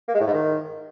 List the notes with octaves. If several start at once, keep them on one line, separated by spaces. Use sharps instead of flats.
A#3
G#3
A2
G#2
D#3